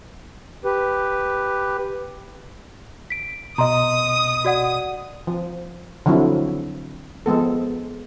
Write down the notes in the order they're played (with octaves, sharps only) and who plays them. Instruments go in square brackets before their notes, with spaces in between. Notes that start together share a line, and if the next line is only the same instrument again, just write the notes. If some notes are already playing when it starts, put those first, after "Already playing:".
[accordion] G4 B4
[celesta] B6 D7
[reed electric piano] B2 D#5 [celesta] A#5 C6 [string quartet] D#6
[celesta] F#4 D5 F#5
[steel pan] F3
D3 F3 F#3 C4 E4
F3 G#3 B3 A4